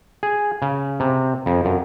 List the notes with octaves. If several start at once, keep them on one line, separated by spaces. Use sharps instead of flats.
G#4
C#3
C3
F2
F#2